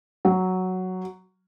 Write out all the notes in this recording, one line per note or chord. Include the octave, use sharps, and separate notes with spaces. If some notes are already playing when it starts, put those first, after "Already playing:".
F#3